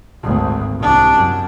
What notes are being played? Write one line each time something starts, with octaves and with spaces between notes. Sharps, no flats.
G#1 D2
C2 D4
F#2